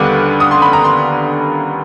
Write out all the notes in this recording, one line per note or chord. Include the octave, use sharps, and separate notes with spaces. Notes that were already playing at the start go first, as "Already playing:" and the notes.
Already playing: D#2 D3 G3 B3 D6
D#6
C6
B5
A#5
C6